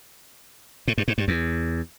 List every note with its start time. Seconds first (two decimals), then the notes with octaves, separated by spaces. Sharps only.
0.88 A2
0.98 G2
1.08 G#2
1.18 G2
1.28 E2